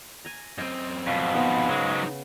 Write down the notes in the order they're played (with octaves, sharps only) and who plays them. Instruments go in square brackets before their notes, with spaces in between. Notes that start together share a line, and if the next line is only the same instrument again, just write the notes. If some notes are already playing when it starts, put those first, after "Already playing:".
[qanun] G#5 A#5
[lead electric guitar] F#2 C4 [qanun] D#5
[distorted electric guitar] F2 B2 [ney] F5
[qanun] B3 [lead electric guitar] D#4 C5
[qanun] C#3 [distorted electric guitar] F#3 G#3